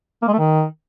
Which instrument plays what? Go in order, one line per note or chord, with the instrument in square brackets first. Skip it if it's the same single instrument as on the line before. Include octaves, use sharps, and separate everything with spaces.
[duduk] A#3
G#3
A3
D#3